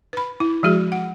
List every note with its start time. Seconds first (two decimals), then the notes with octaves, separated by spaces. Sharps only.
0.13 B4 B5
0.40 E4
0.63 F3 G#3 F#4 G#4
0.92 F#5